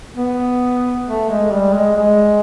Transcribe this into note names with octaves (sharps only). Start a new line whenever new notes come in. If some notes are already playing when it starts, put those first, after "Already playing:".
B3
A3
G#3
G3
G#3
G#3